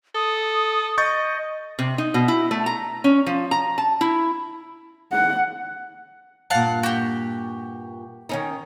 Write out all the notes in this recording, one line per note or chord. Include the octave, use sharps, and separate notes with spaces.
A4 D#6
D#5 C#6 G6 A6
C3
D#4
B2
E4
A3
A#5
C#4
F3
A#5
A5
E4
F#5
G2 A#2 F5 F#5 A5
F#4 G4
D#3 C#4 D#4